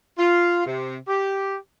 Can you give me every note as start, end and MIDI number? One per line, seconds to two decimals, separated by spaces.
0.18 0.62 65
0.65 0.96 48
1.08 1.55 67